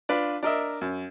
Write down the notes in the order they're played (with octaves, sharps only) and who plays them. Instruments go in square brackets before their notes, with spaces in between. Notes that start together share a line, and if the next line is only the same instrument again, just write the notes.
[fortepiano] D4 F4 B4
D4 A#4 D#5 E5
F#2